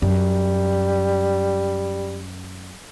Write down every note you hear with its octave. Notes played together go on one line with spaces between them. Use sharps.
F#2 G3